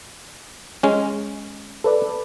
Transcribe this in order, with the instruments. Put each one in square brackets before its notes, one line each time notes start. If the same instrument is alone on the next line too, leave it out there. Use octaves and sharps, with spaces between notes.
[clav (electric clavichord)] G#3 C#4
[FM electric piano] A4 B4 D5